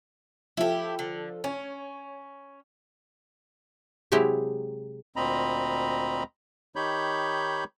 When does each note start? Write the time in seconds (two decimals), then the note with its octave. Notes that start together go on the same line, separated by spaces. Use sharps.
0.57 F3 E4 F4 G4 A4
0.99 D3
1.44 C#4 C#5
4.12 C3 F#3 G#3 E4 G4
5.16 D2 A#2 C4 D#5 A#5 B5
6.76 D#3 D#4 G4 C#5 B5 G6